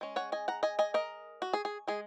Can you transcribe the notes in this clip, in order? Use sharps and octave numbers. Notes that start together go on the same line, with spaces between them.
G#3 C#4
C#5 F#5
D#5 G#5
F#5 A#5
D#5 G#5
D#5 G#5
A#4 D#5
F#4
G#4
G#4
G#3 G#4